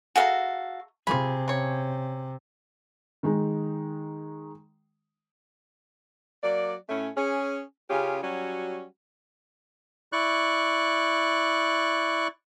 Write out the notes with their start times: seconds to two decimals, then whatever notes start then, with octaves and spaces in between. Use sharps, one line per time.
0.16 F#4 G#4 A4 E5 F5 A#5
1.07 C3 F4 G#4 B5
1.48 C#3 C#5
3.23 D#3 G#3 D#4
6.43 F#3 A#3 D5
6.89 A2 A3 C#4
7.17 C#4 G#4
7.90 C#3 C#4 F4 G4 G#4
8.23 F#3 G3 C#4 F#4
10.13 E4 D5 C#6 F#6